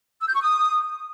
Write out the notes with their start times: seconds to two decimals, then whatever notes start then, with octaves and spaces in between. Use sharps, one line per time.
0.20 E6
0.27 G6
0.34 C#6
0.41 D#6